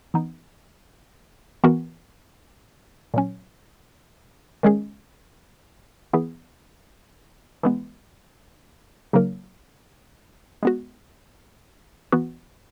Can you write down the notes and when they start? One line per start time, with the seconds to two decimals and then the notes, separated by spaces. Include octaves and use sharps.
0.14 E3 B3 D#4
1.64 E3 B3 F#4 A#4
3.14 A#2 F#3 C#4
4.63 D#3 G#3 C#4 G#4
6.13 E3 B3 E4 G#4
7.63 E3 G#3 B3
9.13 C#3 F#3 A#3 D#4 A#4
10.63 G#3 B3 F#4
12.12 E3 B3 F#4